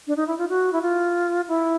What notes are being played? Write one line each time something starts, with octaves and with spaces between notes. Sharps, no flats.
D4
D#4
E4
F4
F#4
E4
F4
E4